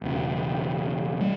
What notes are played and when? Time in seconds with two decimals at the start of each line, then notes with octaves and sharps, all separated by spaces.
0.01 E1 E2 C#3
1.20 G3 A#3